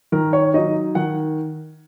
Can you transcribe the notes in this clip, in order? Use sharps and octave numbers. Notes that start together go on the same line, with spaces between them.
D#3 A#4
C#5
F#3 D#4 D#5
D#3 F#5